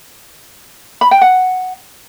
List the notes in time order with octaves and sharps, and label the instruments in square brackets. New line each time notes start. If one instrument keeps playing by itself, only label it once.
[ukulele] B5
G5
F#5